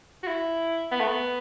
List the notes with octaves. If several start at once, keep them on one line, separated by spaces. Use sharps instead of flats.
F#4
E4
B3
A3
B3